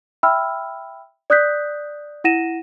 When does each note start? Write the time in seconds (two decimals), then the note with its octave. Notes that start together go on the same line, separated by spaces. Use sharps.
0.23 E5 G5 B5 E6 F6
1.30 D5 D#6 F#6 G6 B6
2.24 E4 F#5 A#6 D#7 E7